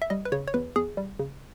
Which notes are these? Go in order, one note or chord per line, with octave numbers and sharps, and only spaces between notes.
E5
G3 D#5
B4
C#3 C#5
C#5
E2 B4
E2 G#4
G3
C#3